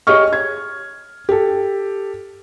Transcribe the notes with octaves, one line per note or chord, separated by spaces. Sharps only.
G4 G#4 C#5 D#5 C#6 F6
G#6
G4 A4